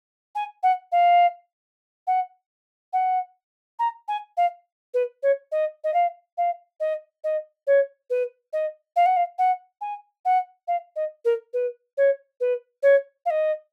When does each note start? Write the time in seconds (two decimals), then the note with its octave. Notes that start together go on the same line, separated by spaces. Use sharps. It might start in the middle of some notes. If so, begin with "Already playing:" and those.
0.35 G#5
0.63 F#5
0.92 F5
2.07 F#5
2.93 F#5
3.79 A#5
4.08 G#5
4.37 F5
4.94 B4
5.23 C#5
5.52 D#5
5.84 D#5
5.94 F5
6.37 F5
6.80 D#5
7.24 D#5
7.67 C#5
8.10 B4
8.53 D#5
8.96 F5
9.06 F#5
9.16 F5
9.38 F#5
9.81 G#5
10.25 F#5
10.68 F5
10.96 D#5
11.25 A#4
11.53 B4
11.97 C#5
12.40 B4
12.83 C#5
13.26 F5
13.30 D#5